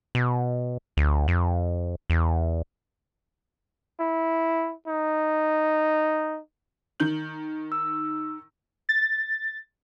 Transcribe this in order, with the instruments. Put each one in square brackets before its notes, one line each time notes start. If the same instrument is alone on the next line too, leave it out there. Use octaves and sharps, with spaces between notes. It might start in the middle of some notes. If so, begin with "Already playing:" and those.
[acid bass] B2
D2
F2
E2
[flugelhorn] E4
D#4
[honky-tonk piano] D#3 G6 F#7
[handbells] E6
[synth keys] A6